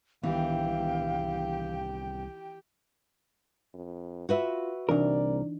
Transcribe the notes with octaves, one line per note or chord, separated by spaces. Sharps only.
C2 D#3 E3 B3 G4 F5 G5
F2
F4 F#4 B4 E5
C2 E3 D4 D#4 A#4 D5